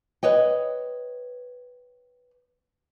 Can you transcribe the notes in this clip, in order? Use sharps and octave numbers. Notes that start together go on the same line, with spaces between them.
B4 C#5 D#5 G5